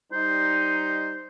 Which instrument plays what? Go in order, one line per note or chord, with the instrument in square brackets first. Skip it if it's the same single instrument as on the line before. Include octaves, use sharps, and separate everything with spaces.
[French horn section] G3 D#4 [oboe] C5